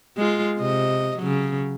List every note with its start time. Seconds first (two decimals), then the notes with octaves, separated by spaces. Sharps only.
0.17 G#3 F4
0.59 C3 D#5
1.18 C#3 F#3